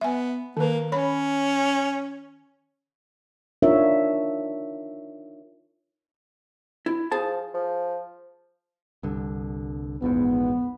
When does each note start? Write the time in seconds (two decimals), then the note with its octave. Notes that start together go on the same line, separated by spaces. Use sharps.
0.01 B3 E5 G#5
0.57 D#3 A#3 B4
0.92 C#4 C#5 B5
3.62 D4 D#4 F4 A#4 C#5 E5
6.86 E4
7.11 F3 G#4 A5
7.54 F3
9.03 C2 G2 D3
10.02 A#1 E2 G#2 B3